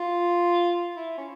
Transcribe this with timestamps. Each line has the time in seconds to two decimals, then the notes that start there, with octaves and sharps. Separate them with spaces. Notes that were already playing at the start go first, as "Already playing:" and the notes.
Already playing: F4
0.96 E4
1.18 C#4